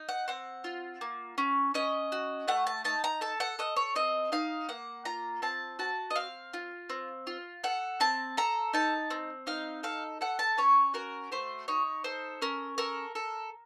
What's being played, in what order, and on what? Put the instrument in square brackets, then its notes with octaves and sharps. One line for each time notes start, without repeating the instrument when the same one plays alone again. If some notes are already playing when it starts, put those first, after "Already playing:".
Already playing: [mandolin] D#4
F#5
C4 F#5
F4
A#3
C#4
C#4 D#5
F#4
A3 F#5
A5
D#4 A5
A#5
A4 A5
F#5
A4 D#5
C#5
C4 D#5
D#4 F5
A#3 F#5
F4 A#5
C4 A5
F#4 A5
D#5
C4 F5
F4
C4
F4
A4 F#5
C4 A5
A4 A#5
D#4 A5
C4
D#4 F5
A4 F5
A4 F#5
A5
C#4 C#5
F#4 A#4
A3 C5
D#4 C#5
A4 C5
C#4 A#4
A4 A#4
A4